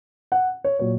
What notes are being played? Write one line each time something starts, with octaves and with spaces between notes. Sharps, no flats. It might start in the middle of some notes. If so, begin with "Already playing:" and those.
F#5
C#5
A#2 F#3 C#5